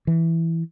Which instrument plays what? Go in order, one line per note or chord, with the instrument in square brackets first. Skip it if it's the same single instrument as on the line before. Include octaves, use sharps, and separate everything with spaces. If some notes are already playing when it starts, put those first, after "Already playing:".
[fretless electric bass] E3